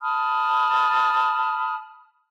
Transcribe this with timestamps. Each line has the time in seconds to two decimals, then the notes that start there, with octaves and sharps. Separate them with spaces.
0.01 A5 B5 D#6 F6